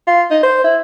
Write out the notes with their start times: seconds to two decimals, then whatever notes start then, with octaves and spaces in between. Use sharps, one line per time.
0.07 F4
0.31 D#4
0.43 C5
0.64 E4